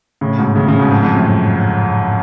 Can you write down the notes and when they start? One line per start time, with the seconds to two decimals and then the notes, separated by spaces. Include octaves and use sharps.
0.21 A2 C#3
0.38 G#2 B2
0.56 A2 C#3
0.67 A2 C#3
0.79 G#2 B2
0.91 F2 G#2
1.03 F2 G#2
1.15 F#2 A2